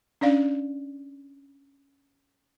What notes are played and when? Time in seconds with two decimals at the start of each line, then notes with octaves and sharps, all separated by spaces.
0.21 C#4 D4 D5 F5